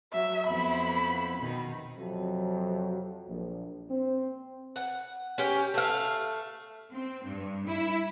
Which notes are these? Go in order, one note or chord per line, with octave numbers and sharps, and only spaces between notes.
F#3 E5
F2 B3 E4 B5
B2 D#3
F2 C3 F#3
A#1
C4
F#5
C#4 G4
A3 F5
C4
G2
E4